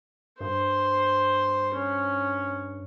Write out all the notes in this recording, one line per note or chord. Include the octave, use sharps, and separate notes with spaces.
G2 C5
C#4